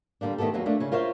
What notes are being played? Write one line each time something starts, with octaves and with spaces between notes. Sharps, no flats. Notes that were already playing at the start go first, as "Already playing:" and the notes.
D3 G3 A#3 D4
D#3 A3 B3 G4 A4
E2 F#3 A#3 F4
A3 A#3 D4
C#3 C#4
F4 A#4 C5 C#5 E5 F5